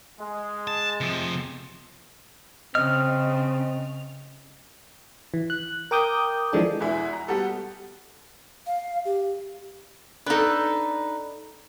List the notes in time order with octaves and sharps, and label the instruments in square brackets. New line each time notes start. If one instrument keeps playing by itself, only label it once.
[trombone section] G#3
[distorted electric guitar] A5
C3 F3
[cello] C#3 [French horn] C4 [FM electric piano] D#5 [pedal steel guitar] F6
[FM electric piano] E3
F#6
A#4 G5 D6 D#6 G6
E3 F3 G#3 D4 A4
[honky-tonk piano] E2 B2 E3 G#3 E4
A#5
G3 B3 F#4 G4 A4
[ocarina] F5
G4
[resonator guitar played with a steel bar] D4 A4 [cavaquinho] D#4 B4